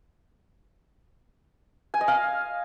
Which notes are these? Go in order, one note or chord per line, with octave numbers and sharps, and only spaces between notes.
G#5
D#5
F5